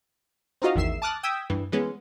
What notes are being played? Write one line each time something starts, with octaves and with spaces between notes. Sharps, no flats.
C4 D#4 F4 F#4 D#5 F5
A1 E2 D#3 E5 C7 E7
A5 D6 D#6 F6 F#6 A6
G5 D#6 E6 G6 G#6 B6
G2 E3
E3 G#3 B3 C#4